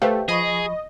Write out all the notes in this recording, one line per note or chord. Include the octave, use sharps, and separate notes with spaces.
A3 G4 B4 C5 F5 G5
F3 G#4 D#5 B5 C#6